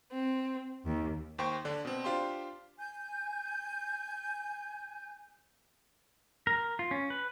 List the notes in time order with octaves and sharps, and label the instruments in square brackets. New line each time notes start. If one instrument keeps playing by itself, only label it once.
[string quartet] C4
D#2
[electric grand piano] D#2 C5 G5 C#6
D3 D4
B2 C4
D4 F4 G4 C5 C6
[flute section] G#5 G6
[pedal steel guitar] A#4
F4
C#4
B4